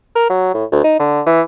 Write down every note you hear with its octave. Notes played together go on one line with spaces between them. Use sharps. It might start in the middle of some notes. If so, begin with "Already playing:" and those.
A#4
F#3
A2
D2
D#4
D3
E3